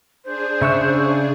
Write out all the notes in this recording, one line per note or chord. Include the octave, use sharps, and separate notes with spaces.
D4 G#4 C5
C#3 E5 C#6 E6 F#6